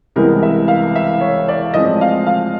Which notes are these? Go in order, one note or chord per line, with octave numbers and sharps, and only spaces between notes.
C2 C3 E3 G#3 B3 A#4
E5
F5
E5
C#5
D5
A2 F3 G#3 C4 D#5
F5
F5